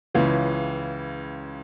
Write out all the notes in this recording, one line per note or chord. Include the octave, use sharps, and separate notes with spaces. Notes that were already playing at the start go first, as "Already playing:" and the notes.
C#2 C#3 E3